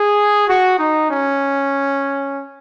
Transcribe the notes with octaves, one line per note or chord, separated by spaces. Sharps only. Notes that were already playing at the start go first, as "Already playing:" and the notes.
Already playing: G#4
F#4
D#4
C#4